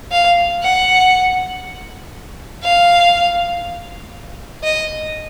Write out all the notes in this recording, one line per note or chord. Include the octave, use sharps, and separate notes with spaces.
F5
F#5
F5
D#5